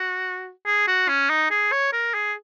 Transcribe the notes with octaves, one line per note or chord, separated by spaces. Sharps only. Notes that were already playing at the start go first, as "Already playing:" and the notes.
Already playing: F#4
G#4
F#4
C#4
D#4
G#4
C#5
A#4
G#4